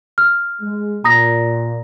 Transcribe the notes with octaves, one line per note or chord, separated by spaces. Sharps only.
F6
G#3
A#2 A#5 D#6 A#6